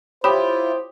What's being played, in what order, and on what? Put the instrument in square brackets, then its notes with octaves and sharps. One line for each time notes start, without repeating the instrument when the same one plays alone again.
[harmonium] E4 F4 [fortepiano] G4 D#6 [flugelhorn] C5 [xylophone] C#5 B5